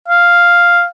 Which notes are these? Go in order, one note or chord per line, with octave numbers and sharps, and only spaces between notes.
F5